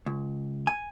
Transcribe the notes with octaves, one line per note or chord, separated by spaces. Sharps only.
C#2
G#5